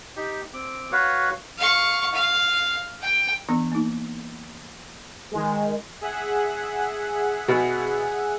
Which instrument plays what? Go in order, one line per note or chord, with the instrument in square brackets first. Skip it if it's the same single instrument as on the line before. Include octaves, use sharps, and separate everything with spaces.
[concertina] D#4 G4
C4 D6
F#4 B4 C#5 F5
[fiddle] F5 C#6
F5
G5
[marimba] E3 B3 D4
A#3 D#4
[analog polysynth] D#3 G#3
[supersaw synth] G#4 E5 F#5
[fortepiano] B2